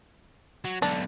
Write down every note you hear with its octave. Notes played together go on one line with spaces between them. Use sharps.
F#3
B1 D3 D4